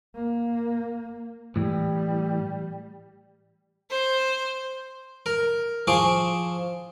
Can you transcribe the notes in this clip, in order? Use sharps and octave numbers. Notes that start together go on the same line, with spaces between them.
A#3
A2 E3 G3
C5
A#4
F3 G#4 C5 C#6 D6